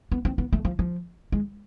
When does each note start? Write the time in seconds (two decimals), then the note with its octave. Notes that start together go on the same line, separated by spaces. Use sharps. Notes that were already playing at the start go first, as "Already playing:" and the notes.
0.12 B3
0.25 C4
0.38 B3
0.53 A3
0.65 F3
0.79 F3
1.32 G#3